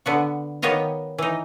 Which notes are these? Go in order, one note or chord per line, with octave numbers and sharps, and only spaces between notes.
D3 B3 F#4
D#3 B3 G4 C#5 D#5 F5
E3 D#4